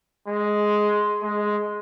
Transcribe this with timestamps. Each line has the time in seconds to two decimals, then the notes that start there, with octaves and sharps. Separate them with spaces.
0.28 G#3
1.22 G#3